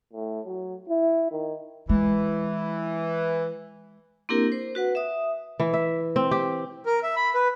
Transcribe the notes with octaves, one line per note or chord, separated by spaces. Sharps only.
A2
F#3
E4
D#3
E3 G#3
A#3 C4 D4 E4 G4 A#4
C5
F#4 B4 F#5
E5 D#6
E3
E5
C4
G4
A#4
E5
B5
B4